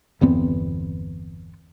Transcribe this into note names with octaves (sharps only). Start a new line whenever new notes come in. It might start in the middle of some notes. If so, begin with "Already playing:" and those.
G1 E2 B3 C4